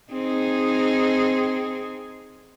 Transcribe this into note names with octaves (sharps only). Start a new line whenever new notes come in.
C4 D#4 G#4